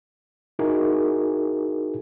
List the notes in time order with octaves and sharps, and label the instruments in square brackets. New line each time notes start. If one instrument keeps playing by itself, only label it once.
[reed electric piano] D#4 E4 F#4 G#4 A#4